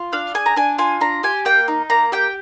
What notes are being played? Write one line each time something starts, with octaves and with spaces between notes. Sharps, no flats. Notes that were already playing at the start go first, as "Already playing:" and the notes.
Already playing: F4
D4 F5
G#4 G#5
A#5
D4 G#5
F4 G#5
D4 A#5
G4 G#5
A#3 G5
D#4
A#3 A#5
G4 G5